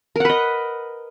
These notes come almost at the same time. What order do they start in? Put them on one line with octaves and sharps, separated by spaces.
A#4 F#5 B4 D#5